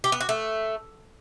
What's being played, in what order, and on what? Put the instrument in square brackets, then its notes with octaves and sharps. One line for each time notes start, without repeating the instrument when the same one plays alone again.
[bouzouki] G4
B3
F#4
A3